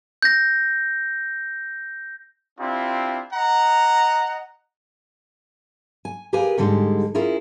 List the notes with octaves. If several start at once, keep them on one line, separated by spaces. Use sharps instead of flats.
G6 A#6
C4 D4 E4 F4 G4
D#5 F#5 A#5
G#5
G4 G#4 A#4 B4 F5 G#5
G#2 D3 G3 G#3 A4
C#4 E4 F4 G#4 A#4